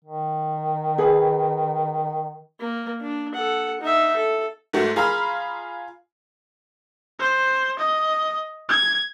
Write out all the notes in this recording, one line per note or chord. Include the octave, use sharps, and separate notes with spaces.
D#3
G#4 B4
A#3
D4
A4 F#5
D#4 E5
A4
G#2 A3 F#4
F4 G#4 A#5 B5 F6
C5
D#5
G#6